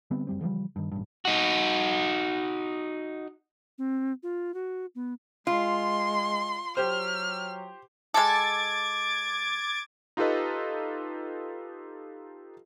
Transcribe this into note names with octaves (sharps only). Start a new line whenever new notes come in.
D3 G3 B3 C4
F#1 G3 C4
C#3 E3 F3 G3
G2 D#3
A1 G2
D#4 F#4
C4
F4
F#4
B3
G#3 F4 C6
F#3 G4 C5 F6
G#3 A4 D6 G#6 A6
D#4 F4 G4 A4 B4 D#5